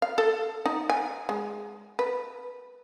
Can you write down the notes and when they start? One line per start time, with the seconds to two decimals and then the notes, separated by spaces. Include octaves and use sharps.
0.02 F5
0.18 A4
0.66 D#4
0.90 G#5
1.29 G#3
1.99 B4